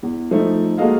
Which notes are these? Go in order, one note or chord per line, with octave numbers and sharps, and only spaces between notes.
E2
F3 A3 D#4
G#3 A#3 F#4 A4 D#5 F5